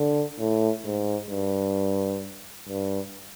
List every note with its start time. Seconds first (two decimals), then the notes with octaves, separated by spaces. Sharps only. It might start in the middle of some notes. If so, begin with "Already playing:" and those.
Already playing: D3
0.39 A2
0.85 G#2
1.30 G2
2.68 G2